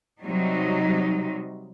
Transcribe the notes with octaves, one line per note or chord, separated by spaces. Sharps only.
C3 F#3 G3 D#4